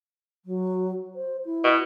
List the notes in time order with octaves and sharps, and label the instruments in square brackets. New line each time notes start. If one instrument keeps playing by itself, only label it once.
[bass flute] F#3
C5
E4
[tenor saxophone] B2